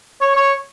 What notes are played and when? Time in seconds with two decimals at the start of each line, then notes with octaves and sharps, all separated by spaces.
0.21 C#5
0.36 C#5